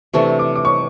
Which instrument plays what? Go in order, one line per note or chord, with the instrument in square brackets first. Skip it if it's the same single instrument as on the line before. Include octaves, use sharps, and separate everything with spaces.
[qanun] C3 E3 A3 D4 [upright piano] C#6
[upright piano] D6
D6
C#6